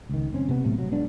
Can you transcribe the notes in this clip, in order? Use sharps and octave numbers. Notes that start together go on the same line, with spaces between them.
C#2 D#3
F#1 C4 C#4
C3 B3
B1 A2 C3 A3
F#3
B1 G#3 B3 D4